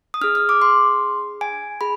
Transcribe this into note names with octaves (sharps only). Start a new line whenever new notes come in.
D#6
D4 G#4 F6
F6
D6
C6
G#5
G#4 B5